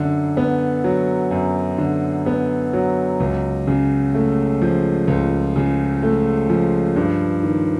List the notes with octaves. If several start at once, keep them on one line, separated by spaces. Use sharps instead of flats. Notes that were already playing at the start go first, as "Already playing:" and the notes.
Already playing: F#2 D3
B3
F#3
F#2
D3
B3
F#3
C#2
C#3
A3
F3
C#2
C#3
A3
F3
G2
D#3